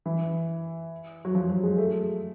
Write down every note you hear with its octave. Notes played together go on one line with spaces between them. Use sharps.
E3
F#3
F3
F#3
G#3
A3